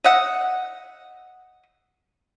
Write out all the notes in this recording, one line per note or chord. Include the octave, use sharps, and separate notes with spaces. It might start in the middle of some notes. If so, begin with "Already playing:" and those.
D#5 E5 F#5